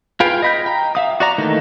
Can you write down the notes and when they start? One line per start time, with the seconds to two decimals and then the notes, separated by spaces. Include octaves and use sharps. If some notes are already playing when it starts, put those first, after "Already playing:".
0.20 F4 G#4 B4 F5 G5
0.42 D#5 B5 G6
0.66 G5 A#5
0.95 E5 F5 D#6
1.20 F#4 D5 A#5
1.38 D#3 E3 A3 A#3 D#4